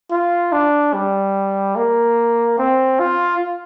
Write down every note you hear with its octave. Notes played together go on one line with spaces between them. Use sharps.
F4
D4
G3
A#3
C4
F4